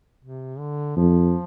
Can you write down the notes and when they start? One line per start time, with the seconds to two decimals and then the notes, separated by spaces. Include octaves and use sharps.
0.24 C3
0.59 D3
0.96 F2 F3